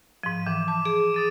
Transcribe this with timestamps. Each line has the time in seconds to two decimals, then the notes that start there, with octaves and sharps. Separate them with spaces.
0.23 G#2 F3 D#7
0.46 E3 D6
0.68 A5 D6
0.85 G#4 D7
1.14 D#6 A6 D#7